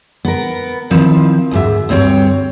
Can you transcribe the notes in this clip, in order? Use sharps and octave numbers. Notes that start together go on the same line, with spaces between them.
B3 A#4
D#3 F3 C4 E4
D2 G#2 E5
D2 G2 C4 C#5 G5